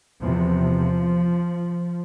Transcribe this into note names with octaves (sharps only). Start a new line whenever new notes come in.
E2 C3 F3